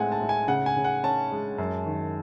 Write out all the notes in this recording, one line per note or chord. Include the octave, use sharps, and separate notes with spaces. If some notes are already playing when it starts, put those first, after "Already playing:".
Already playing: A2 G#3 C4 F#5 G#5
A5
A2
G#5
C#3 F#5
G#5
C#3
F#5
C#4 A5
G#3
F#2
D#3